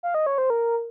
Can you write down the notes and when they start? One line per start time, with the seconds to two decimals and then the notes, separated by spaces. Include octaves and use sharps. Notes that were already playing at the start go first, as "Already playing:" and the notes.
0.03 F5
0.14 D#5
0.26 C#5
0.38 C5
0.50 A#4